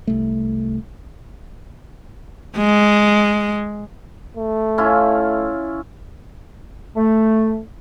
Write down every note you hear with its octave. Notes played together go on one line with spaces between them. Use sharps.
C2 A3
G#3
A3
C#4 E4 F4
A3